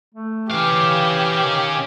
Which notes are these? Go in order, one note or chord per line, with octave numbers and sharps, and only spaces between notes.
A3
E3 C#4 G4 F5
D#3